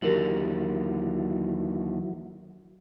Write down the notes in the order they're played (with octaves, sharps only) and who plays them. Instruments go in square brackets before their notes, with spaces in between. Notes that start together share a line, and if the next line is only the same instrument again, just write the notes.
[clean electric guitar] D#2 D3 [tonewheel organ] E3 F#3 [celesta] G4 A#4 F#7